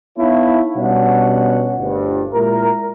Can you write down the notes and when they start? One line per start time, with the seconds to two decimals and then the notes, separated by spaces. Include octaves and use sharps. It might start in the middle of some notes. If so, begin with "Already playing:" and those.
0.16 B3 D#4 E4 A4 C#5 F5
0.75 B2 G3 C#4 D4 F#5
1.77 G1 D2 G2
2.32 A#2 G#3 E4 A#4